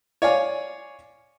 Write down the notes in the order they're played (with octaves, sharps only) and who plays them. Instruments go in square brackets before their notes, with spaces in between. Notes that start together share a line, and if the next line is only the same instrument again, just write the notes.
[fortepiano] C#5 D5 F5 G#5